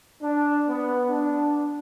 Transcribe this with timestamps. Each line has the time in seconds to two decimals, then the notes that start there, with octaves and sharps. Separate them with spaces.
0.22 D4
0.68 B3
1.09 D4